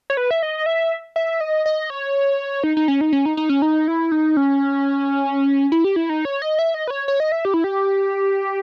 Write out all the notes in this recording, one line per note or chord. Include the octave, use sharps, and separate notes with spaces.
C#5
B4
E5
D#5
E5
E5
D#5
D#5
C#5
D#4
D#4
C#4
D#4
C#4
D#4
D#4
C#4
D#4
E4
D#4
C#4
E4
G4
E4
D#4
C#5
D#5
E5
D#5
B4
C#5
C#5
D#5
E5
G4
E4
G4